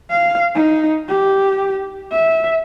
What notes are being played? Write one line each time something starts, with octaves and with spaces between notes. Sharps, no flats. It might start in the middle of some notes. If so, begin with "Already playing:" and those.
F5
D#4
G4
E5